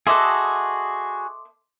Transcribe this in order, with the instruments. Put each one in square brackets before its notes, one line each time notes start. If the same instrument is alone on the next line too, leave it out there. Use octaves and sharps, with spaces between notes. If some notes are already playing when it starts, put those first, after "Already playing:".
[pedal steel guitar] F#4 G#4 [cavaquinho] A4 D#5 E5 [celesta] C6 D6